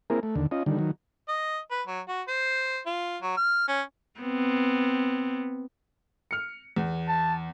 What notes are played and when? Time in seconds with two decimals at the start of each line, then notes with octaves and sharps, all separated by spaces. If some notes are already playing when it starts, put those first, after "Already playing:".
0.10 A#3 C4 E4 G#4 A#4
0.23 A3
0.36 D#2 D3
0.51 C#4 F4 D#5
0.66 D3 D#3 G3
0.79 D#3 F#3
1.28 D#5
1.71 B4
1.87 F#3
2.08 F#4
2.28 C5
2.86 F4
3.22 F#3
3.37 F6
3.68 C#4
4.21 B3 C4
6.31 F6 C#7
6.76 E2
7.08 A5